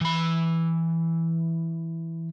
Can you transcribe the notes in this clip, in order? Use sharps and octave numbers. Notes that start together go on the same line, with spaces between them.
E3 B5